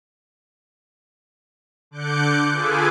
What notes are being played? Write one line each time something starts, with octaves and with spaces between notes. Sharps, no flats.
D3 D6 F#6 G6 C#7
F4 G#4 A4 B4 G#5 D6